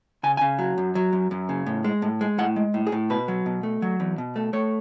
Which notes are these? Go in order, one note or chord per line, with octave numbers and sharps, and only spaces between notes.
C#3 G#5
C#3 G#5
F#3
F#2
F#3
F#2
F#2
C#3
A2
G#3
A2
G#3
A2 F#5
G#3
A2
G#4
A2
B2 B4
F#3
B2
A3
F#3
E2
B2
A3
A3 C#5